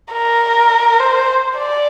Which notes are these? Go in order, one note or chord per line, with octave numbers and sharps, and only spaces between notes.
A#4
C5
D5